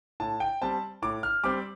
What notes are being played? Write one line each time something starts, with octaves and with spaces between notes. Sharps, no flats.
A2 A5
G5
G3 C4 A5
A2 D6
F6
G3 C4 D6